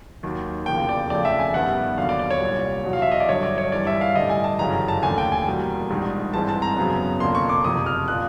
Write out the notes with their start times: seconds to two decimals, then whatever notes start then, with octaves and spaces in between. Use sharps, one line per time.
0.23 D#2 D#3 F#3
0.66 E1 D#2 C#3 F3 G5
0.89 D5
1.10 F2 C#3 F3 A3 D5
1.25 E5
1.39 G#5
1.54 G2 D#3 G3 B3 F#5
1.98 D#2 D3 F#3 F5
2.09 D5
2.19 D5
2.31 C#5
2.40 C2 A#2 G3
2.84 E2 B2 F#3
2.93 F5
3.02 E5
3.11 D#5
3.20 D5
3.29 G2 D3 F#3 C#5
3.43 D5
3.58 C#5
3.72 G#1 G2 E3 G3 D5
3.87 E5
4.01 F5
4.15 A1 G2 D3 G3 D#5
4.30 G#5
4.44 A5
4.59 G1 F#2 C#3 E3 G3 A#5
4.88 A5
5.03 D#2 D3 F3 A3 G#5
5.18 G5
5.32 G#5
5.46 E2 B2 G3 A#3
5.90 A#1 G#2 D#3 G3
6.33 G#1 G2 E3 G#3 C4 A5
6.49 A5
6.62 A#5
6.77 F#2 C#3 F#3 B3
7.20 F1 F2 D3 F3 A#3 C6
7.35 C#6
7.49 D6
7.64 F#1 F2 C3 F3 D#6
7.86 F6
8.08 A#2 F3 F#6